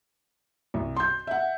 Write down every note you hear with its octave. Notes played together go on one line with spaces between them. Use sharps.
C2
C6 G6
E5 F#5